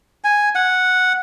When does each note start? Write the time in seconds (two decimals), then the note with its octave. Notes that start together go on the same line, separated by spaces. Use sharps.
0.24 G#5
0.55 F#5